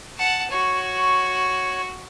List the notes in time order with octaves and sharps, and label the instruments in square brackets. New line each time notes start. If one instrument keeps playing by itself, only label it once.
[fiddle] F#5 A5
[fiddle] F#4 [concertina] C#5 C#6